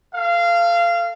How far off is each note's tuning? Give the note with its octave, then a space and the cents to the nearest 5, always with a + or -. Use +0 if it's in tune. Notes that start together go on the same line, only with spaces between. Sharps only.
A4 +20 F5 -20